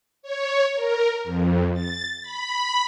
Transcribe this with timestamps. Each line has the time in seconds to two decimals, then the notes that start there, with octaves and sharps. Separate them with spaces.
0.22 C#5
0.75 A#4
1.24 F2
1.74 A6
2.22 B5